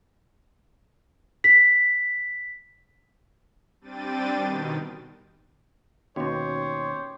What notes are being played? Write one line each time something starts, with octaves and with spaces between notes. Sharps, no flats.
B6
G3 C4 D4 G5 A6 D#7
B2 D#3
D#2 B2 C#4 F#4 G4 C5 C#5